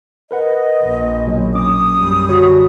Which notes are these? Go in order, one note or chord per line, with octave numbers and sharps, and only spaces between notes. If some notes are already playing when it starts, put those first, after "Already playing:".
A#4 B4 D#5 F#5
A#1
D#2 B2 F#3
F#3 C#4 D6 D#6
F#2 G3
D3 F#4 C#5